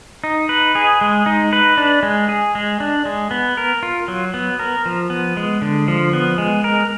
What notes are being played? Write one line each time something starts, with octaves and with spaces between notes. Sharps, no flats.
D#4
B4
G#4
G#3
D#4
B4
D4
G#3
G#4
G#3
D4
G#3
B3
A#4
F4
F#3
B3
A#4
F3
B3
G#3
D3
F3
B3
G#3
A#4